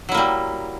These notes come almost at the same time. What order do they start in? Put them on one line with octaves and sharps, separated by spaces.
F#3 E4 A#3 G3